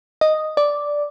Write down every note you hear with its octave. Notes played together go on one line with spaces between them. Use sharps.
D#5
D5